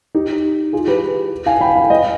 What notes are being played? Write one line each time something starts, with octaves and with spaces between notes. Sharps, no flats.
D#4 G4
F4 G#4
G4 B4
F5 G#5
G5 B5
F5 G#5
D#5 G5